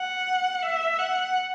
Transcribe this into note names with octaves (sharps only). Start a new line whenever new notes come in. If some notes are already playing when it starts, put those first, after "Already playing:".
Already playing: F#5
E5
F#5